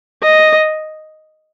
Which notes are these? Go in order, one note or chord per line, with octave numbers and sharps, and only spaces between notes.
D#5